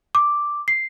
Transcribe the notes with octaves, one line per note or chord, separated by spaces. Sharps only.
D6
C7